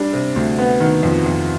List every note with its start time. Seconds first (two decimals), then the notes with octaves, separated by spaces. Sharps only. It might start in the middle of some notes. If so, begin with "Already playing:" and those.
Already playing: G3 D4
0.13 C3
0.36 D2
0.58 B3
0.80 D#3
1.03 F2
1.26 F2